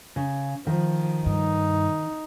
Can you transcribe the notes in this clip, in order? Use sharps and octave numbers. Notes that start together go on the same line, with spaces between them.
C#3
D#3 F3
G2 D#4